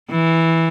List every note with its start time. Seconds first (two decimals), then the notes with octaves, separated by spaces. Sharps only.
0.10 E3